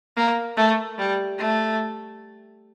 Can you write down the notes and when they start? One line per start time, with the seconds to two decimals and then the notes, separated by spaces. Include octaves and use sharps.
0.17 A#3
0.57 A3
0.99 G3
1.38 A3